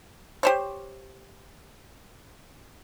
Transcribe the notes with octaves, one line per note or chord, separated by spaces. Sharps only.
G4 C5 C#5